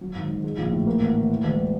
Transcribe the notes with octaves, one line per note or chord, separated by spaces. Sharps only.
F#3
G#1
G#2
G#3
A#1
A2
A#3
A1
A2
E3
E1